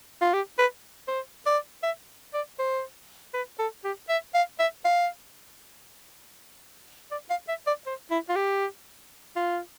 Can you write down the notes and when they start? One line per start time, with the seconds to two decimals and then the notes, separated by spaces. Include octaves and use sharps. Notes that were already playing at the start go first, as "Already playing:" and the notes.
0.21 F4
0.33 G4
0.58 B4
1.08 C5
1.46 D5
1.83 E5
2.34 D5
2.59 C5
3.34 B4
3.59 A4
3.84 G4
4.09 E5
4.34 F5
4.59 E5
4.84 F5
7.11 D5
7.30 F5
7.48 E5
7.67 D5
7.86 C5
8.11 E4
8.29 F4
8.36 G4
9.36 F4